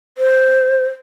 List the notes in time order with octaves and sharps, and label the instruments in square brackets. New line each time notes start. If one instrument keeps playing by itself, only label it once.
[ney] C5